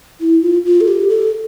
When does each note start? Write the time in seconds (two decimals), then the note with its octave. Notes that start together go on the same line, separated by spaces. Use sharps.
0.21 E4
0.42 F4
0.65 F4
0.81 A4
0.88 G4
1.10 A4